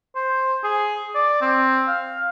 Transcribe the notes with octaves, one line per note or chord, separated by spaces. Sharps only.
C5
G#4
D5
C4
F5